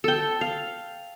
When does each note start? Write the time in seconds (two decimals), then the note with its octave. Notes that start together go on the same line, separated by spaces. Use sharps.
0.04 A4 G5
0.41 F5